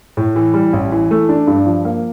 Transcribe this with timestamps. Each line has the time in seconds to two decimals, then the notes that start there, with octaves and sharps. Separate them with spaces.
0.17 A2
0.36 E3
0.54 G3
0.73 A1
0.92 E3
1.11 A3
1.29 D4
1.47 G2
1.66 F3
1.85 A#3